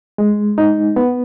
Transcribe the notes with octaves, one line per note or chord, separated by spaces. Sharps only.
G#3
D#4
B3